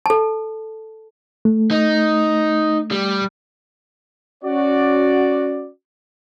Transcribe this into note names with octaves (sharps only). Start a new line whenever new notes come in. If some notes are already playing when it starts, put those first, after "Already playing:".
A4 A5
A3
D#4
G3
C#4 F#4 D5